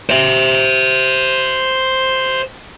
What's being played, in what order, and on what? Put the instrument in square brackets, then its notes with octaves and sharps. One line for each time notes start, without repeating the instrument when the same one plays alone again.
[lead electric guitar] C5 E5